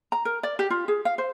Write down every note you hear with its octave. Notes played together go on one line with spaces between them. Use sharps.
A#5
A#4
D5
G4
F4
G#4
F5
C5